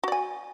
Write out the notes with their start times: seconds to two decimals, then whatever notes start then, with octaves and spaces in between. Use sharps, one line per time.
0.04 F#4
0.08 D5
0.12 G#5